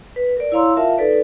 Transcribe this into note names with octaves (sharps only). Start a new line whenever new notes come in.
B4
A#4 D5
E4 C#5 F5 A#5 C6 E6
F4 A#4 E5 F5 A5
D#4 A4 B4 D5